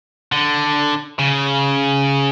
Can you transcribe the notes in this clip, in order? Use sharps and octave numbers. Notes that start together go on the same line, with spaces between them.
D3
C#3